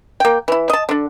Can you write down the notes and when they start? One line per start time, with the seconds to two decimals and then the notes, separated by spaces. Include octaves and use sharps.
0.20 A#3 G5
0.48 E3 E4
0.70 D#5 A5
0.89 D3 D4